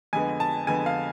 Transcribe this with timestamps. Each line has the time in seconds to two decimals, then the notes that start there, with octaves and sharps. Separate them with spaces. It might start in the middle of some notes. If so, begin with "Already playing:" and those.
0.13 F2 D3 G#3 B3 G#5
0.40 A5
0.67 F2 D3 G#3 B3 G#5
0.86 F5